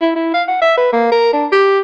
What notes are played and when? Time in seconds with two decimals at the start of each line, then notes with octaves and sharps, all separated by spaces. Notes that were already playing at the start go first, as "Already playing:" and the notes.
0.01 E4
0.15 E4
0.34 F5
0.48 F#5
0.61 E5
0.77 B4
0.93 A#3
1.12 A#4
1.33 D4
1.52 G4